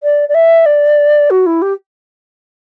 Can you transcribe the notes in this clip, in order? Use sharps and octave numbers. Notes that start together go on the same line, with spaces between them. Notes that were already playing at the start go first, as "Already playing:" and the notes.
D5
D5
E5
D5
F#4
E4
G4